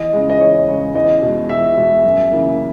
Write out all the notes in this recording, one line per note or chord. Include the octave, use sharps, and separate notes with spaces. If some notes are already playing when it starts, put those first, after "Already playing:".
Already playing: E2 D#5
C#3 G#3
D#5
E2 C#5
C#3 G#3
E2 D#5
B2 G#3
E2 E5
B2 G#3
F#2
C#3 E3 A#3